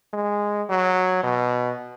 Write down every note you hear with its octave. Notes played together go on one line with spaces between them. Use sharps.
G#3
F#3
B2